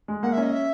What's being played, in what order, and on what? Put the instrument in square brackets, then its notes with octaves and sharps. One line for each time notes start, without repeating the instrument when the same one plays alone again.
[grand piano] G#3
[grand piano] A#3 [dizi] F#5
[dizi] E5
[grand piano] C#4
[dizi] D#5
E5